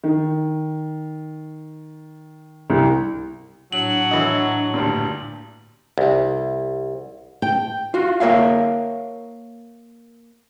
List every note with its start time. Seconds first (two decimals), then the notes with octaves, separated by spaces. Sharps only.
0.04 D#3
2.70 C2
3.73 A2 F#3 D4 F#7
4.11 E3 D#5
4.74 D2 G2 A#2
5.98 C2
7.42 G5
7.94 F4 F#4
8.20 A#3 A#4 C#5 E5 F5